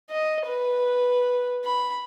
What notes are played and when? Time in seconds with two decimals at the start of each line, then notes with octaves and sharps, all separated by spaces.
0.10 D#5
0.46 B4
1.65 B5